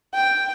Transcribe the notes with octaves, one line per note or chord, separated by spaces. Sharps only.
G5